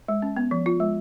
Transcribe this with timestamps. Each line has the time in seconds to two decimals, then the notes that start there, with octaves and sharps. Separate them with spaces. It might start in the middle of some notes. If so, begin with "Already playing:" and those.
0.08 G#3
0.22 C#4
0.36 B3
0.51 F3
0.66 F4
0.80 G#3